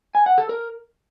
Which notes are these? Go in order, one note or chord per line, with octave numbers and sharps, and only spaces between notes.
G#5
F#5
A4
A#4